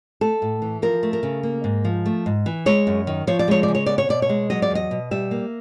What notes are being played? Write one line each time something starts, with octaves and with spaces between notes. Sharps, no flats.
A3 A4
A2
E3
F3 A#4
A3
A#4
C#3
A#3
G#2
F3
A3
G#2
E3
G#3 C#5
F#2
D#3
F3 C#5
D5
G#3 C#5
D5
C#3
C#5
B3 D5
C#5
B2 D5
C#5
G#3
F#3 D#5
D5
E2 D#5
B2
G3 E5
A#3